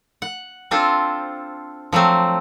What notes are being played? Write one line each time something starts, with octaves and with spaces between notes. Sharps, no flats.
F#5
C4 D4 F4 A4 C5
F3 F#3 A3 C4